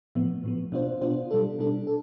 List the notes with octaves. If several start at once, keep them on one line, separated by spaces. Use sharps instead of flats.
A2 F3 B3
A2 F3 B3
B2 B3 D4 F4 C5
B2 B3 D4 F4 C5
B2 G3 D4 A4
B2 G3 D4 A4
A4